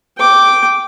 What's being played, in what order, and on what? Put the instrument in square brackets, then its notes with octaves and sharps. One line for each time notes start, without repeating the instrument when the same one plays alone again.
[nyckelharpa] G5 D6